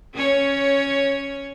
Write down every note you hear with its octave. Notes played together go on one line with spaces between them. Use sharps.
C#4 C#5